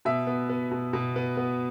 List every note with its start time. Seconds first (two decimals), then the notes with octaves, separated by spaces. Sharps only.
0.05 B2 E5
0.27 B3
0.49 B3
0.71 B2
0.93 B2
1.16 B3
1.37 B3